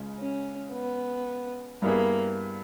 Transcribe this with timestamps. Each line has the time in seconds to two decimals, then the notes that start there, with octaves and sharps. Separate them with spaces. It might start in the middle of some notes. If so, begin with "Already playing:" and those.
Already playing: C#2 C#3 G#3
0.19 C#4
0.73 B3
1.82 G2 G3 A#3 B3 E4 G#4